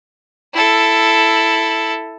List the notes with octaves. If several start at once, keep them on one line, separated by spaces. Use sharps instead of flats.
E4 A4